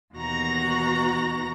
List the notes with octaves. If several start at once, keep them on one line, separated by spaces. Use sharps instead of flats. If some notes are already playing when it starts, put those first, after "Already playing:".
D#2 B2 E3 F#4 A#5 A#6